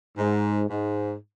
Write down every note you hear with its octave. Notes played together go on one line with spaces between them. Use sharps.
G#2
G#2